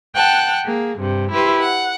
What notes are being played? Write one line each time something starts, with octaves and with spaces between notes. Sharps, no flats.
F#5 G5 A5 F#6
A#3 G#4
G2 C3
E4 G4 B4 C6
F#5